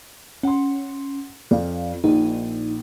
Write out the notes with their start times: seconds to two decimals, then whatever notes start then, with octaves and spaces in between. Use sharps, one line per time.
0.43 C#4 F#5 C6
1.51 F2 D5 F5
2.04 A#1 A#2 D#4